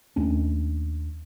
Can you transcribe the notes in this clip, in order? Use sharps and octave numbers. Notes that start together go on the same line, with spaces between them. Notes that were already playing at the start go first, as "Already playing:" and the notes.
D#2 A3 C#4 D4